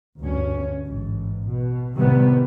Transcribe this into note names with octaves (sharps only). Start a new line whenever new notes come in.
D2 G2 C#4
A1 G#2
B2
A2 C3 D#3 G3 B3